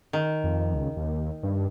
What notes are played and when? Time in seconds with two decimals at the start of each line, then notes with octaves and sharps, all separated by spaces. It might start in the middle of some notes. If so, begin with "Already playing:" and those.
0.13 D#3
0.44 F2
0.74 C#2
0.97 D#2
1.43 G2